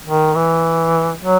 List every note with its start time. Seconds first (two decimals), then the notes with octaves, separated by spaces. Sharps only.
0.07 D#3
0.35 E3
1.20 F#3